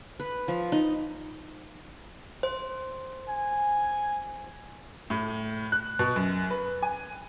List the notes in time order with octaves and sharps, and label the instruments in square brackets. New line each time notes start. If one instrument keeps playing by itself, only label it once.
[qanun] B4
F3
D#4
[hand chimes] C5
[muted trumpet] G#5
[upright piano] A2
F#6
B2
F#2
B4
G#5